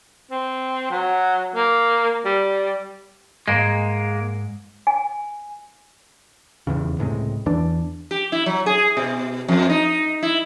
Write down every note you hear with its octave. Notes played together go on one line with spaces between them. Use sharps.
C4
F#3
A#3
G3
G#2 G#3 A#3
G#5
D#1 E2 C#3
C#2 A2 C3 G#3
E2 E3 D4
G4
E4
F#3
G#4
B2
F2
D#4
E4